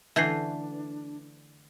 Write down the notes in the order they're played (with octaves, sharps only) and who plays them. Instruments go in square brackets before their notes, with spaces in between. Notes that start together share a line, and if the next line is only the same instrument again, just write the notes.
[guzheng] D3 A3 B4 [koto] E3 [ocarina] D4 [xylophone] E5 G6 C7